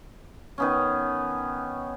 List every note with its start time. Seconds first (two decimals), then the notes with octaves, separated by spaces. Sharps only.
0.58 D#3 B3 C#4